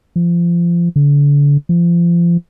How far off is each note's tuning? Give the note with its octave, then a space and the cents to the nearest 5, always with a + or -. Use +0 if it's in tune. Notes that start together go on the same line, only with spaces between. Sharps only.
F3 -25
D3 -35
F3 -30